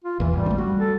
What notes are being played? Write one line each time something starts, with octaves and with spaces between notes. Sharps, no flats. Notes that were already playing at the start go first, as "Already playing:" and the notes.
F4
A#1 E2 E3
G#1 G3
C#3 A3
G3 F#4
A4